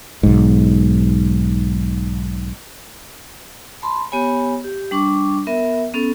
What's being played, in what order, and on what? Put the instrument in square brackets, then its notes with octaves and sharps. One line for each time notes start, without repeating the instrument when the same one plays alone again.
[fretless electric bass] B1 G#2
[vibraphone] A5 B5 C6
B3 G4 C#5 G#5 B5
G4
G3 D4 C#6 D6
B3 A#4 E5
B3 C#4 A4